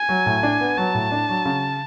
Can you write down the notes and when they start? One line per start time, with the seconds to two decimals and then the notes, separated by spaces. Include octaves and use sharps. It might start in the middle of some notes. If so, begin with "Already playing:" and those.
Already playing: G#5
0.09 F#3
0.26 A2
0.43 D4
0.60 B3
0.77 F#3 A5
0.95 A2
1.12 D4
1.29 F#3
1.45 C#3